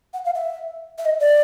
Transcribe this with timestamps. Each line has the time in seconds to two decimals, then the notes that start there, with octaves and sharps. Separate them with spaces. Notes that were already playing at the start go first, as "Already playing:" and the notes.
0.14 F#5
0.25 F5
0.35 E5
0.98 E5
1.05 D#5
1.20 D5